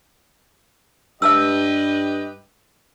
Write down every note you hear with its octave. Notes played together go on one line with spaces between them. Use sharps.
G2 G4 B4 D#5 E5 A5 E6